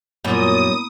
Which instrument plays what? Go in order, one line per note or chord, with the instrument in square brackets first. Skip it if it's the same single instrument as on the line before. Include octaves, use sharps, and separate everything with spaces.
[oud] F#2 A#2 [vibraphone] A#3 B3 E4 [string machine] D#6